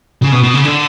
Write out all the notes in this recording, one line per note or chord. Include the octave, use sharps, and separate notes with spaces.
C#3
B2
B2
C#3
D3